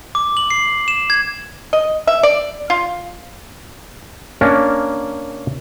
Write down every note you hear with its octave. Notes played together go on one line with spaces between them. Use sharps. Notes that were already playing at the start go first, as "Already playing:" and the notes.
D6
F#7
C7
E7
G#6
D#5
E5
D5
F4
A#3 C#4 D4 A#4